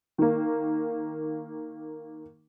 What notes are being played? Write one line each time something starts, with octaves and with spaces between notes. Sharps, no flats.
D#3 A#3